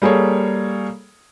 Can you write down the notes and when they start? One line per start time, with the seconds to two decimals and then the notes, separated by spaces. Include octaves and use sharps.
0.02 G3 A#3 G#4 A4 C#5